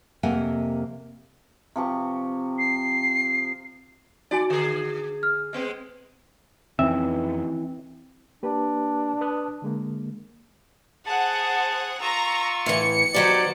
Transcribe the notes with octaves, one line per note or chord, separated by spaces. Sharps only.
F2 C3 A#3 A#4 F#5 G#5
C3 F3 C#6
C7
D#4 F#4 D5 G#5
D3 G#4
F6
G#3 B3 C4
F2 D#3 E3 C4 C#4 E4 E5
A#3 D4 G4 B4
B4 D#6 F#6
D3 G#3 A#3
G#4 C5 F#5 A5
F4 A#5 C#6 E6
A2 E3 C#7
D#3 F#3 B3 G4 C5 D5